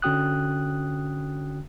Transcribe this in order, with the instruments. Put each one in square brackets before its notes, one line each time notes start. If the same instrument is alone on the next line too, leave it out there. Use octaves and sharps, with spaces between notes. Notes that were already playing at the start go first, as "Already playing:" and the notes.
[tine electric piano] D3 C#4 F#4 G5 D#6 F#6